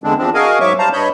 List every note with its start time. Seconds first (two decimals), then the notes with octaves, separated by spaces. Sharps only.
0.04 E2 D3 G#3 C4 D4
0.18 E2 F3 C4 D4
0.34 F#4 G#4 A#4 D#5 F5 G#5
0.61 G#2 F#3 C#5 E5 C#6 D6
0.79 G3 C5 F5 A5 A#5
0.93 G2 C#5 D#5 B5 G6